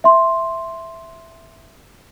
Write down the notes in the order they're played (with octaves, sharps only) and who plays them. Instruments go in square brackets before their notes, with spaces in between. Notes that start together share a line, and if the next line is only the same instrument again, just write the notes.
[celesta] E5 C6